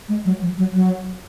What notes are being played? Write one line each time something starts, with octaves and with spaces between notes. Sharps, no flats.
G#3
F#3
F3
F#3
F#3